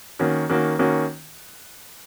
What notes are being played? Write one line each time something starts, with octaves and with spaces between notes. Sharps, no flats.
D#3 A#3 C#4 F#4
D#3 A#3 C#4 F#4
D#3 A#3 C#4 F#4